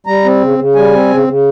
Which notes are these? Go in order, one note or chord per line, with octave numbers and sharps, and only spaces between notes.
G3 A#5
C4
C#3
C#3
G3 G#5
C4
C#3
C#3